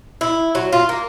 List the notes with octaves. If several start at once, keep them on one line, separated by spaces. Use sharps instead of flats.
E4
F#3
F4
A#3